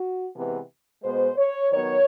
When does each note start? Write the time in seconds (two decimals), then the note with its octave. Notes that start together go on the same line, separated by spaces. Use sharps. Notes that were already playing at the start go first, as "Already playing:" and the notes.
Already playing: F#4
0.34 C3 E3 G#3 B3
1.03 B2 G#3 B3 C5
1.37 C#5
1.72 D#3 F#3 B3 C#5